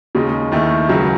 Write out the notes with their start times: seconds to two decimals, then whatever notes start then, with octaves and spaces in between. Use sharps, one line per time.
0.15 D#2 C#3 G#3 D#4
0.52 D#2 D#3 A3 E4
0.89 C#2 C#3 F#3